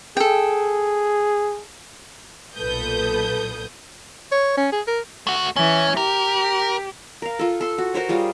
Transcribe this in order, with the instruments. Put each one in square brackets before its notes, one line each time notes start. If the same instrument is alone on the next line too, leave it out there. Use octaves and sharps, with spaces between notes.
[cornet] G#4 [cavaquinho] A4 G5
[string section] B1 A#2 A4 B4 D#6 G6
[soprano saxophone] C#5
C#4
G#4
A#4
[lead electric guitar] A3 F#4
[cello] E3 [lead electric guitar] C#4
[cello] G4 [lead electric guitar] A#4
[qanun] A#4 F5
F4 A4
A4 C6
F#4
F#4 A#4 C5 C#5
G3 F4 G#4